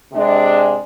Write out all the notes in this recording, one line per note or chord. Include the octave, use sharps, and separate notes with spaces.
C3 G#3 D4